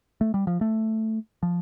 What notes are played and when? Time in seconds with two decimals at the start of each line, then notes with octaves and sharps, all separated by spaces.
0.21 A3
0.34 G3
0.47 F3
0.61 A3
1.43 F3